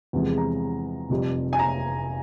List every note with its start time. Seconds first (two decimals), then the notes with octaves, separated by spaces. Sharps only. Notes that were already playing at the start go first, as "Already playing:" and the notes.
0.13 E2 C3 F3 G#3
0.38 A#5
1.10 F1 F2 C3 G3
1.53 G#5
1.59 A#5